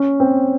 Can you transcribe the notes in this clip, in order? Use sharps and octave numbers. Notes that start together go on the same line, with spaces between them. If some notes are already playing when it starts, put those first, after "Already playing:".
Already playing: C#4
C4